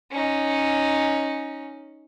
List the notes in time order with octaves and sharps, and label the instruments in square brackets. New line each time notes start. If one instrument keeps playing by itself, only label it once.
[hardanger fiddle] C#4 D#4